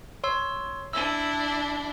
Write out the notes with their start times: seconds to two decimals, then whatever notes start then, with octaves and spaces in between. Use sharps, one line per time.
0.24 C#5 C6 E6
0.93 D4 E4 E6